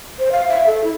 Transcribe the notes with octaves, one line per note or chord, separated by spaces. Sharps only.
C5
F5
E5
A4
E4